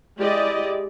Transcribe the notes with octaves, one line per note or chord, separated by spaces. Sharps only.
G#3 E4 G4 D5 D#5